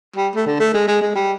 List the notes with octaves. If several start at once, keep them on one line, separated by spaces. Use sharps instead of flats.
G3
A3
D3
A3
G#3
G#3
G#3
G3